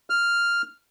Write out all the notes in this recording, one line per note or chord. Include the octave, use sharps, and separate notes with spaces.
F6